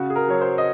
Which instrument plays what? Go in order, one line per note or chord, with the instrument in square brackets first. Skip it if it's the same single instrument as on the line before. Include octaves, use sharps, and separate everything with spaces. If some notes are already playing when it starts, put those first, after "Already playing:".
Already playing: [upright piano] C#3 F#4
G#4
A#4
F#3 C#5
C5
D#5